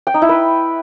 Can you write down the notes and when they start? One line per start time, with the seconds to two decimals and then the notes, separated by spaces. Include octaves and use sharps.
0.07 G5
0.14 D#4
0.22 E4
0.29 B4